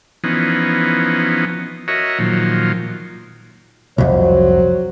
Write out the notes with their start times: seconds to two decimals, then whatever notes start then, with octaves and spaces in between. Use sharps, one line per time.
0.24 E3 F3 B3 C#4 D#4
1.88 F#4 A#4 C#5 D#5 E5
2.19 A#2 D#3 F3 F#3
3.98 C2 F2 F#3 C5